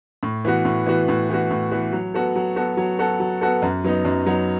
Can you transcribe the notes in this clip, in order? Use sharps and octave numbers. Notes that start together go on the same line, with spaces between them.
A2
E3 B3 F#4
A2
E3 B3 F#4
A2
E3 B3 F#4
A2
E3 B3 F#4
F#3
B3 F#4 A4
F#3
B3 F#4 A4
F#3
B3 F#4 A4
F#3
B3 F#4 A4
F#2
F#3 B3 D#4
F#2
F#3 B3 D#4